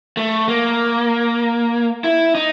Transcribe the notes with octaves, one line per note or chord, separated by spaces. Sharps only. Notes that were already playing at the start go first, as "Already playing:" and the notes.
A3
A#3
E4
D#4